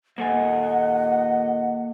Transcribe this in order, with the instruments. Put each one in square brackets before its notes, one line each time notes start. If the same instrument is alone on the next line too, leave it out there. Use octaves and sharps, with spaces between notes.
[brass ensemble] D#2 A#2 D#5 [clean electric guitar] A#3 A4 G#5 [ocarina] F#5